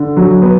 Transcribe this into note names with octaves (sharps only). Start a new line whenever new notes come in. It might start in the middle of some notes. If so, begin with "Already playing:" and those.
Already playing: D3
F#3
B3